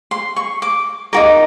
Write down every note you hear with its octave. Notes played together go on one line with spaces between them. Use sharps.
C6
C#6
D6
D#4 F#4 A#4 D6